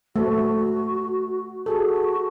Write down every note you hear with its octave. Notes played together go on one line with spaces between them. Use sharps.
A3 F#4 A4 C5
F#4 G#4 A4